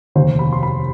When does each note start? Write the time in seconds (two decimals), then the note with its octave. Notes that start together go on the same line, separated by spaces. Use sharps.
0.15 F1 D#2 D#3 C5
0.39 B5
0.53 C6
0.63 B5